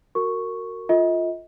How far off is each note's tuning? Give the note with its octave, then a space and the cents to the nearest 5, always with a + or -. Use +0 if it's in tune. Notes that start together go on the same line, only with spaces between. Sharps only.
F#4 +0 A#4 -25 C#6 +0
F4 +0 A4 +0 D#5 +35